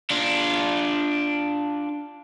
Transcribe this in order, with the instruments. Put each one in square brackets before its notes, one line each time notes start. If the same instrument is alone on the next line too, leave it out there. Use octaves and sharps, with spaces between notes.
[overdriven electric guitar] D4 F4